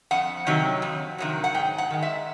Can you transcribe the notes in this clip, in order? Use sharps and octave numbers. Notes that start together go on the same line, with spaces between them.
F2 F#5
C3 D#3 F#3
F2
C3 D#3 F#3
F#5
G#2 G5
F#5
D#3 G#3
E5